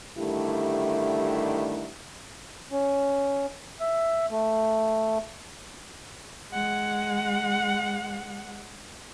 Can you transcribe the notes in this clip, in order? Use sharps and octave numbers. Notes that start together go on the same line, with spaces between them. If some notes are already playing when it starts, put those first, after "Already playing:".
G2 D3 D#3 A3 E4 G4
C#4
E5
A3
G#3 F#5